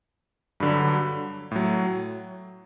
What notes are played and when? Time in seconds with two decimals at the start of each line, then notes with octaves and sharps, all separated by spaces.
0.60 G2 D3 F#3 B5
1.51 A2 F#3